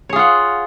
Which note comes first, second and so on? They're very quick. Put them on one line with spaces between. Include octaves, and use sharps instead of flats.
C#5 G#4 F4 F#5